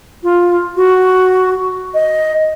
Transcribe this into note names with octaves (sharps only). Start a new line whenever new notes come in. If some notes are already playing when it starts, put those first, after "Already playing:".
F4
F#4
D#5